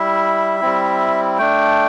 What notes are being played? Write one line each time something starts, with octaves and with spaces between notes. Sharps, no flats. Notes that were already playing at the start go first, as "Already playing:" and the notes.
Already playing: G3 E4 E5
G3 C4 E4
A3 D4 G5